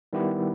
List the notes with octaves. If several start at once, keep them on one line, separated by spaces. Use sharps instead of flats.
D#3 G3 B3 E4 G4